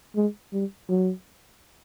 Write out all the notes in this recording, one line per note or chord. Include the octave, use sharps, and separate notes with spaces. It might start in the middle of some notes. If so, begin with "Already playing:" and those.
G#3
G3
F#3